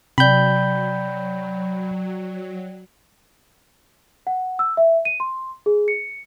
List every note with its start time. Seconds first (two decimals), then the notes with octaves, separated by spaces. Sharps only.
0.18 C3 F#3 D5 G5 B5 G6
4.27 F#5
4.59 E6
4.77 E5
5.05 D#7
5.20 C6
5.66 G#4
5.88 C#7